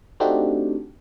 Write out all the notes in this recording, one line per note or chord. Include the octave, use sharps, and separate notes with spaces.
A3 C4 D4 D#4 F#4 G4